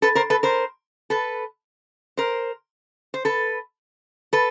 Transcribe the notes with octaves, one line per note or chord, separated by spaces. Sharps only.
A4 B4
A#4 C5
A4 B4
A#4 C5
A4 B4
A#4 C5
C5
A4 B4
A4 B4